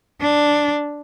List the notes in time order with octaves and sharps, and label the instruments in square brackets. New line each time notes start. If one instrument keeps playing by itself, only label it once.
[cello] D4